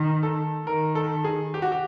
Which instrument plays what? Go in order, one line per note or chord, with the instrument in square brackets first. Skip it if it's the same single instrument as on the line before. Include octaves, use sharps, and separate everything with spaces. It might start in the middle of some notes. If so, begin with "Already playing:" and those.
Already playing: [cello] D#3
[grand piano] A4
[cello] D#3 [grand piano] A#4
[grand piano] A4
G#4
G4
F#4
G4